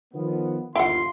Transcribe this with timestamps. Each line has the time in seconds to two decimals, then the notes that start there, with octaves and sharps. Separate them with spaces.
0.14 D#3 F3 B3
0.75 G1 D#2 E4 F4 F#5 C6